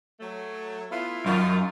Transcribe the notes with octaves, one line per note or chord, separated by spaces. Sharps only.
F#3 A3
A3 B3 E4 F4
F#2 D#3 F4